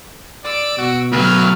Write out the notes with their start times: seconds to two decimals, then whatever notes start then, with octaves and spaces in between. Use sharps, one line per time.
0.45 D5 E6 D7
0.78 B2 F#4
1.12 D2 F#3 A3 B4 F6